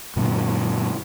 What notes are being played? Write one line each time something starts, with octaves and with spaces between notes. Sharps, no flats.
F#2 A#2 D3